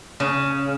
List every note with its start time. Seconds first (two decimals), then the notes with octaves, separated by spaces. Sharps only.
0.20 C#3